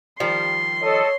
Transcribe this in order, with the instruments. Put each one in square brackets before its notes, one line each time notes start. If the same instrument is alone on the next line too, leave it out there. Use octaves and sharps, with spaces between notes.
[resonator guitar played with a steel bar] D#3 F3 G3 [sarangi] C6
[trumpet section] A4 D#5 [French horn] C#5